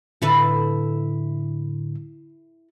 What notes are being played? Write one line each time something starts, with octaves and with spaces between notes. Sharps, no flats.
A2 D3 E4 A4 B4